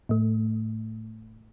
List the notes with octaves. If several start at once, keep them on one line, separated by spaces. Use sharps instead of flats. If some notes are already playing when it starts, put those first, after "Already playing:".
A2 A3